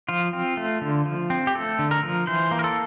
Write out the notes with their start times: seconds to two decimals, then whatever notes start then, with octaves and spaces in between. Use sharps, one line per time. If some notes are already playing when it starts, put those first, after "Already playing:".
0.09 F3 F4
0.33 C4
0.57 A3
0.81 D3
1.05 F3
1.30 C4
1.47 G4
1.55 A3 A4
1.79 D3
1.91 A#4
2.03 F3
2.27 E3 C5
2.51 A#3
2.59 A#4
2.64 A4